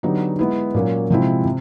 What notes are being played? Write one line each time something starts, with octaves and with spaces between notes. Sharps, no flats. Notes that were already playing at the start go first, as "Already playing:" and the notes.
D3 F#3 B3 D#4 G4
G#3 B3 E4
A#2 F#3 A#3 C#4
C3 F3 G#3 C4 E4
C3